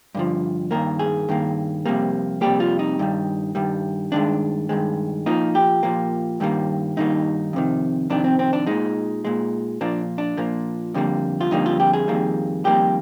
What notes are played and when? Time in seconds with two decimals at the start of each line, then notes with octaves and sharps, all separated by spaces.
0.15 G2 D3 F3
0.71 G2 D#3 A#3 A#4
0.99 G#4
1.29 G2 D#3 A#3
1.86 F2 C3 G3 A#3
2.41 F2 C3 G3 A#3 G4
2.60 F4
2.79 D#4
2.99 G2 D#3 G3
3.55 G2 D#3 G3
4.12 G2 D#3 G#3 D4
4.69 G2 D#3 G#3
5.26 A#2 F3 A#3 D#4
5.55 G4
5.83 A#2 F3 A#3
6.40 G2 D#3 G3 A#3
6.97 G2 D#3 G3 A#3 D#4
7.53 F2 C3 D#3
8.10 F2 C3 D#3 D4
8.24 C4
8.39 C4
8.53 D4
8.66 A#2 G#3 D#4
9.25 A#2 G#3
9.81 A#2 F3 A#3 D4
10.18 D4
10.37 A#2 F3 A#3
10.94 F2 D3 G3 A#3
11.41 F4
11.51 F2 D3 G3 A#3 D#4
11.66 F4
11.80 G4
11.93 G#4
12.08 F2 D#3 G3 A#3
12.65 F2 D#3 G3 A#3 G4